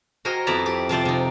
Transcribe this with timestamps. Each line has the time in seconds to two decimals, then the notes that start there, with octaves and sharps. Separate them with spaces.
0.25 F#4 A#4 C5 D#5 G5 G#5
0.47 F2 B3 E4 D5 E5 A#5
0.66 G4
0.89 C3 F3 C5 D5
1.05 C3 D#4